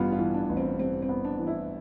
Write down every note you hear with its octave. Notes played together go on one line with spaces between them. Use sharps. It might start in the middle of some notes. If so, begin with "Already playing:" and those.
Already playing: A1 G2 B3 F4
F4
E3
D4
A1
C4
G2 C4
C4
B3
D4
E3
E4